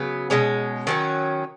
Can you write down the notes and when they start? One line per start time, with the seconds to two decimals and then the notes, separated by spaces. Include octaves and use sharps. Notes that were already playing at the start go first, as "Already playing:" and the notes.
Already playing: C#3 F#3 B3
0.30 B2 G#3 C#4
0.87 D#3 F#3 C#4